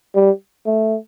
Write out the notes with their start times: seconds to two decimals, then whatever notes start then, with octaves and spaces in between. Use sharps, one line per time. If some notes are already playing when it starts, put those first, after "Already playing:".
0.15 G3
0.66 A3